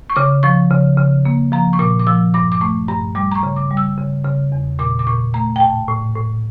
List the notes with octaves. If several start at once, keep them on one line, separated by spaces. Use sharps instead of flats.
C#6
C#3 D6
F3 C#6
C#3
C#3
A#3
F3 A#5
C#6
A#2 D6
D6
F3 E6
G2 D6
D6
A3 C#6
G2 A#5
G3 D6
A#5
C#6
C#3
D6
G3
E6
C#3
C#3
E2
A#2 D6
D6
A#2 C#6
A3 A#5
G5
A2 A5
A2
A2